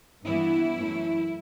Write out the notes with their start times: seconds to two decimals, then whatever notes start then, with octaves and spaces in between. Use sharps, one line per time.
0.24 G2 E3 G3 B3 E4
0.74 F#2 E3 A3